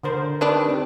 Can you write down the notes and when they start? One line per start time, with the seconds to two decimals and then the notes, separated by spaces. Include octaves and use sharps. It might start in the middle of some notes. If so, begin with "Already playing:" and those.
0.03 D3 A#4 C5
0.41 D#3 G3 D4 B4
0.69 C4 G4